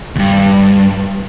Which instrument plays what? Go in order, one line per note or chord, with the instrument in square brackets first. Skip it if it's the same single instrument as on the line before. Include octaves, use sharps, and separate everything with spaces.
[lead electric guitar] D2 G2